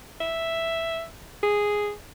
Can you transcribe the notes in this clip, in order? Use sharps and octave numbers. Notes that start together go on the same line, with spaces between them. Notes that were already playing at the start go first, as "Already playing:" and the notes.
E5
G#4